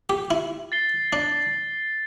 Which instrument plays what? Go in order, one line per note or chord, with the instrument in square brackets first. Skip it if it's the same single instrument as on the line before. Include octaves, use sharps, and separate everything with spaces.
[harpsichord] G4
E4
[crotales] A6 C7 G7
[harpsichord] D4